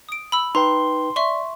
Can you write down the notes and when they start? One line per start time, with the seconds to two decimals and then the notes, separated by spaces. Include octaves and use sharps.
0.09 D#6 D7
0.32 B5 E6
0.55 D#4 B4 G5 A#5 C6
1.16 D5 E5 C6 C#6